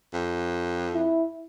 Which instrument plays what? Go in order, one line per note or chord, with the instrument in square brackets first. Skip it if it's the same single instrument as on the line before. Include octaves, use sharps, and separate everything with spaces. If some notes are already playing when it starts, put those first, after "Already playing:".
[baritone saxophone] F2
[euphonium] E4